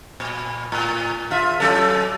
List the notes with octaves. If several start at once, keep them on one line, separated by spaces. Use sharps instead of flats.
A#2
A2
E2 F4 E5
F#3 C#4 A4